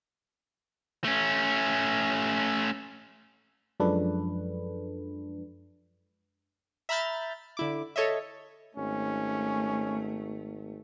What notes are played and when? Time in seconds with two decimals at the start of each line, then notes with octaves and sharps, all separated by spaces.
1.04 A3 C#4
3.80 F#2 F3 G#3 D4 A4 B4
6.89 E5 A#5 B5 F6 G6 A6
7.57 D3 E4 D6
7.96 A4 C#5 D#5 E5
8.77 G#1 A3 C#4